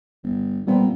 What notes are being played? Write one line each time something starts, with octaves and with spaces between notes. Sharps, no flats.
G1
A#2 G3 B3 C4